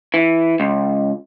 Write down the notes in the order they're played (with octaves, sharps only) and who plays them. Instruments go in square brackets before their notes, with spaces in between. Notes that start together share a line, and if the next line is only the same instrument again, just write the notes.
[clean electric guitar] E3
C#2